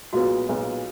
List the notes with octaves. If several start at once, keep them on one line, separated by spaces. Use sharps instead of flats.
B1 A#2 G#3 B3 F4 F#4
B1 A#2 G#3 B3 F4